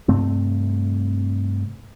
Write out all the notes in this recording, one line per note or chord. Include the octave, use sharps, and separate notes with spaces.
G2 C3 A3 C4